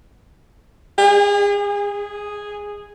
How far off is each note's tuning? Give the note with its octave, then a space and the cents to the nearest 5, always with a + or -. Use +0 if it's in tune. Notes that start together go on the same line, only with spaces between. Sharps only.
G#4 -35
G#4 -10